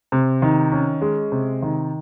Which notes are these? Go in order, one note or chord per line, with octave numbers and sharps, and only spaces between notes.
C3
D#3
C#4
G#3
C3
D#3